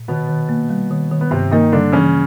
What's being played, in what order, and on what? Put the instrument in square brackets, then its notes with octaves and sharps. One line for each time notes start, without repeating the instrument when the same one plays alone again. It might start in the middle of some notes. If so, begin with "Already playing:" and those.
Already playing: [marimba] A#2
[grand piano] B2 B3 [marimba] D#3
[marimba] D#3
A#3
G3
D#3
D#3
[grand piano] B3
[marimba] G2 [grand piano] C3 C4
[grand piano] D#3 D#4 [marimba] A#3
[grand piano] D3 D4 [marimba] G3
[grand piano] C#3 C#4 [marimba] E3